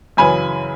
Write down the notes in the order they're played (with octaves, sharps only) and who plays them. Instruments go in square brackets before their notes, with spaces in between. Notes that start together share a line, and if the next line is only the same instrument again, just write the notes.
[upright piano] F#2 C#3 E3 G#5 B5